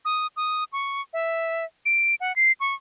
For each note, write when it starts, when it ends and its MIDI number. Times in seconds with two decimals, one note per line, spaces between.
0.05 0.27 87
0.37 0.64 87
0.73 1.02 85
1.13 1.65 76
1.86 2.15 98
2.20 2.35 78
2.36 2.52 96
2.60 2.75 85